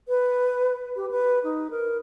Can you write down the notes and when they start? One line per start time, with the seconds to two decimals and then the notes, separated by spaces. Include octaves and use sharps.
0.08 B4
0.96 G4
1.11 B4
1.44 D#4
1.71 A#4